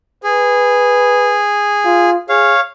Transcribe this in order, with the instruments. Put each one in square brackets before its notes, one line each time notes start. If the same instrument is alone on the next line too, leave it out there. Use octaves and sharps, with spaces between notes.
[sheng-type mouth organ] G#4 [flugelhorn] B4
[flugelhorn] F4
[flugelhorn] G#4 [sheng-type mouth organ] C#5 F5